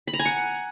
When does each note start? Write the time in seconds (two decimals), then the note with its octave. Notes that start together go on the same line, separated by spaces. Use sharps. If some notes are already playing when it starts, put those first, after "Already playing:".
0.07 B5
0.13 A#5
0.19 G#5
0.25 F#5